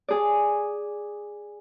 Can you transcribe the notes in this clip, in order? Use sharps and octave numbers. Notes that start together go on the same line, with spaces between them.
G#4 D5